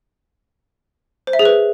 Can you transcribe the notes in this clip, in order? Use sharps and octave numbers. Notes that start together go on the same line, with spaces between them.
C5
E5
G#4
B4